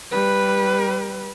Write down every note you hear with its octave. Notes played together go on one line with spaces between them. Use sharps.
G3 B4